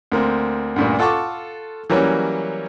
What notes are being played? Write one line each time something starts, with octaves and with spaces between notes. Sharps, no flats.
D2 A#3 C4
D2 G2 A#2
F4 A4 F#5 A5 C#6 D6
E3 F#3 G3 A#3 C#4